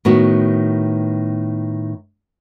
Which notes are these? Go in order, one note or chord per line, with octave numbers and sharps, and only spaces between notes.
A2 D#3 B3 F#4